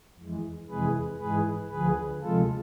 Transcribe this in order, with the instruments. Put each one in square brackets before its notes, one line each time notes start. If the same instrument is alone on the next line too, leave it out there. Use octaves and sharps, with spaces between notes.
[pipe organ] F2 E3 G#3
F2 C3 E3 G#3 G#4 B4
G#2 E3 G#3 G#4 B4
D2 D3 F3 G#4 B4
D2 C3 F3 G#3 F4 A4